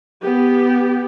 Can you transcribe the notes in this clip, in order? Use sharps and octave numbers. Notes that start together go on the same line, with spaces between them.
B3 G4